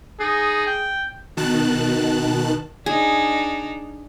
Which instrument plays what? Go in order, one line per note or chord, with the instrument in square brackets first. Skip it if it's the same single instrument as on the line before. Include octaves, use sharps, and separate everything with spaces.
[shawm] D#4 [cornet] G#4
[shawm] G5
[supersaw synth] B2 D#3 A5 F#6
[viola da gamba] D4 D#4 [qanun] G#4